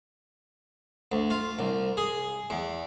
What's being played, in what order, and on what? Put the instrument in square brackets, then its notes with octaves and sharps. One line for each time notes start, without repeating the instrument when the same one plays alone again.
[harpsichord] D2
F4
C2
G#4
E2